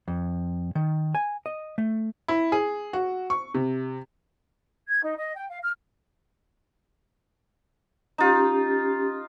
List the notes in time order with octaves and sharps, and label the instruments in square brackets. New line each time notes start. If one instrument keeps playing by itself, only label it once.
[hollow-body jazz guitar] F2
D#3
G#5
D#5
A3
[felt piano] E4
G#4
F#4
C#6
C3
[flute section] G#6
D#4
D#5
G5
F5
F6
[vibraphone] C#4 G4 [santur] D#4 F4